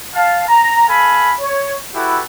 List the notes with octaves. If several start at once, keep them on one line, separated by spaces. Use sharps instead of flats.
F5 A5
A#5
A4 F5 G#5 B5
C#5
E4 F#4 G4 A4 B4